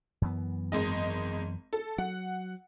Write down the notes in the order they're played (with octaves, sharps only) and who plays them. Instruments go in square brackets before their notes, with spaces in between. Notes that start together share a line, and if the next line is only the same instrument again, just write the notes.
[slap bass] F#2 E3 B3
[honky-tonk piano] G#1 G#3 D#5
A4
[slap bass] F#3 [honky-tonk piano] F#5